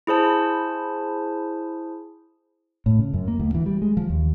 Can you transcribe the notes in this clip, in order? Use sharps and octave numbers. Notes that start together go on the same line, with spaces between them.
E4 G#4 C5 A5
A2
C#3
F#2
A#3
D2
E3
G3
G#3
F3
D#2